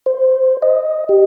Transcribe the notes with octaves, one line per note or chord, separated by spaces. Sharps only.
C5
D#5
G4